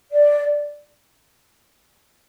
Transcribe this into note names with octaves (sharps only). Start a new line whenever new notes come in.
D5